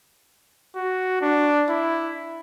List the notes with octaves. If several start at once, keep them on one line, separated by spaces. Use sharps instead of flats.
F#4
D4
E4